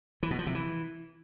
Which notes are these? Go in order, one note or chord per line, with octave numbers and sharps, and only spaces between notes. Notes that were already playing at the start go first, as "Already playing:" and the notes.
E3
B2
F3
C3
E3